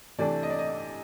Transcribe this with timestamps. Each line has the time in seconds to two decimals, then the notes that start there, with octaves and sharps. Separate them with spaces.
0.18 C3 E3 A3 D4 D5
0.43 D#5
0.50 D5
0.59 D#5